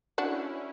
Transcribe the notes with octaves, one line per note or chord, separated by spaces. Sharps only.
C#4 D4 E4 F#4